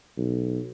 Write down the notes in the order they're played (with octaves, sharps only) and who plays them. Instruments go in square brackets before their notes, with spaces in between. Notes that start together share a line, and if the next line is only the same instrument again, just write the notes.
[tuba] B1